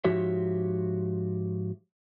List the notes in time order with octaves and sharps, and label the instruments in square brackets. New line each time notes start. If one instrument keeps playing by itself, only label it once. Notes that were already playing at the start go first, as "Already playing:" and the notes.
[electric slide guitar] G#2 F3 F#4 G4 C#5 E5